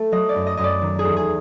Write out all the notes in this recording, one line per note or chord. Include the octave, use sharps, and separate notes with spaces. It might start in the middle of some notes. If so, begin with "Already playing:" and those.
Already playing: A3
F#3 D#5
D5
F#2
D#5
F#2 D#5
D5
D#3
G#4
E2
G#4